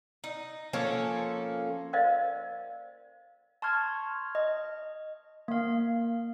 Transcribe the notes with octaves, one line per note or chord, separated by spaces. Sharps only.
D#4
F3 A#3 C#4 A4
A#4 C5 D5 D#5 F5
A5 C6 C#6 F6 G#6
D#5
A#3 F5